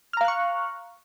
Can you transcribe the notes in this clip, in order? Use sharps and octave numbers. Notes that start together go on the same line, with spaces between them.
F5 A#5 C#6 F6 F#6